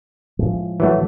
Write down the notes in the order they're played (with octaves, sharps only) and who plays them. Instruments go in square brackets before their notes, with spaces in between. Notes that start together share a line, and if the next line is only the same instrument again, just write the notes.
[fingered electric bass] A2 F3 G#3
[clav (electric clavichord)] E3 F#3 A3